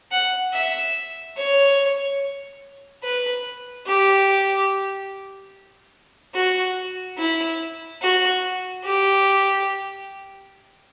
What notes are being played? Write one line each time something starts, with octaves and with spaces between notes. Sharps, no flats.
F#5
E5
C#5
B4
G4
F#4
E4
F#4
G4